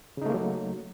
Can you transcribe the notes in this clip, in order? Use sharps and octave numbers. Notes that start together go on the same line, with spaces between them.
C#3 F#3 A3 A#3 D#4